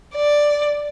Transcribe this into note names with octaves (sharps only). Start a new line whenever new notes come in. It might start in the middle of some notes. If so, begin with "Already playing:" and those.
D5